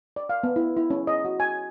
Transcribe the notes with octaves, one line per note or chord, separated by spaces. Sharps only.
D5
F5
B3
E4
E4
C#4
D#5
F#4
G#5